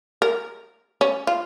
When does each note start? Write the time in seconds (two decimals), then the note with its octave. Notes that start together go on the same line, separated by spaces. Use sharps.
0.22 A#4
1.01 C#4
1.27 F4